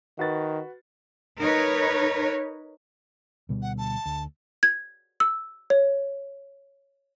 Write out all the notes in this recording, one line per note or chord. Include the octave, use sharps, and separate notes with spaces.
D#3 F#4 B4 A6
D#4 A#4 B4 C#5
D2 B2 G3
F#5
A5
D2
G#6
E6
C#5